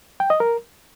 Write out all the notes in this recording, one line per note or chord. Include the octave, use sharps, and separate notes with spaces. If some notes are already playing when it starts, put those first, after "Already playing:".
G5
D#5
A#4